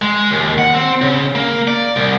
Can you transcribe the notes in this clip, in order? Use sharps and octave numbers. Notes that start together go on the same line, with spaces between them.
G#3
D#2
F#5
C4
C#3
A#3
D5
C2